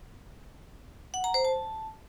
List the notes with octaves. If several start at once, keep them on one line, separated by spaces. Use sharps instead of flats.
F#5
A#5
C5
A5